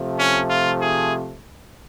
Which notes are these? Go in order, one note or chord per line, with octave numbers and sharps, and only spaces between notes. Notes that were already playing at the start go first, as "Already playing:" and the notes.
Already playing: C3 F3 A3
C#4
F4
G#4